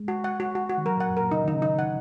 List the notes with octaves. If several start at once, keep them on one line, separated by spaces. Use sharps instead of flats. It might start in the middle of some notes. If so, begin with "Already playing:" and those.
Already playing: G#3
F#4
F#5
F#4
F#4
F#4
D#3
F#3 A#4
A#2 F#5
F#2
A#2 A#4
C#3 D#4
D#3 D#4
C#3
D#4
F#5